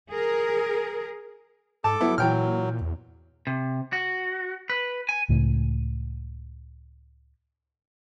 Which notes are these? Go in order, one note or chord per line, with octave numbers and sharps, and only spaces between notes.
G#4 A#4
G#2 A4 A5 D6
F#3 B3 E4
A#2 E3 F#3 G5 F6
E2
C3
F#4
B4
G#5
C#2 A2